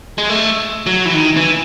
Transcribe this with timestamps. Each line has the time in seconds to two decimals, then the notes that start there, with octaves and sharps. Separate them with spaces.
0.18 G#3
0.30 A3
0.86 F#3
1.05 E3
1.14 D#3
1.37 E3